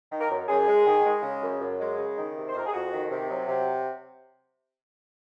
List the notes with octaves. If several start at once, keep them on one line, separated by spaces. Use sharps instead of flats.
D#3
A#4
F#2
F#2 G#4
G#3
D#3
G#3
C#3
F#2
F#2
G#3
C#3
D#3
C3
C5
F2 A#4
G#4
F2 F#4
D#3
C3
F#3
C3